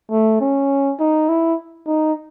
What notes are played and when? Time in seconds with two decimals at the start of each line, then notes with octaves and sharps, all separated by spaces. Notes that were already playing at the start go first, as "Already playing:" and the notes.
0.11 A3
0.41 C#4
1.00 D#4
1.29 E4
1.86 D#4